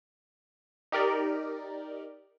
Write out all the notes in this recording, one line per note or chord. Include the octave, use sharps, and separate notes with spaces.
D#4 G4 A#4 D5